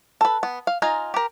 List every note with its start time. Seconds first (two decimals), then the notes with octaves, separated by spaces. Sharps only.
0.21 A4 B4
0.43 B3
0.67 F5
0.82 D#4 F4 F5 G#5 A#5
1.14 G4 A#4